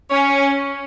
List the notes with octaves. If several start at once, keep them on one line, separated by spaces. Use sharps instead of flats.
C#4